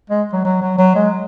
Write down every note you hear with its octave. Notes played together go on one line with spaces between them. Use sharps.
G#3
F#3
F#3
F#3
F#3
G#3